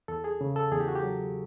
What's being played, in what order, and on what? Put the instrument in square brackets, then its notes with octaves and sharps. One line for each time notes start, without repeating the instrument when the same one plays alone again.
[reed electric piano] E2 A4
G#4
C#3
A4
E2 G#4
G4
F#4
G4
F#3